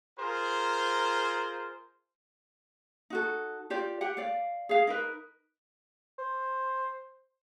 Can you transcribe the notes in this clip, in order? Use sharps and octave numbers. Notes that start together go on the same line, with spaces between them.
F4 G#4 A#4 C5
D#4 F#4 A4
F4 G4 D5
G4 F#5 G5
D5 F5
G#4 F5
D#4 A#4 B4
C5